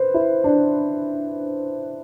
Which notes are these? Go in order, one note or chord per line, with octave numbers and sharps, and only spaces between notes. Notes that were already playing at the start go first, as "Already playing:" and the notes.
Already playing: B4 C5
E4
D4